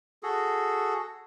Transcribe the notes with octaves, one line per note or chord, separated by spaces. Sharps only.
F#4 G#4 A4